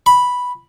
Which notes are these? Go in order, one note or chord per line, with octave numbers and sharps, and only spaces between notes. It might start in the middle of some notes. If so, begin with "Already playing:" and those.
B5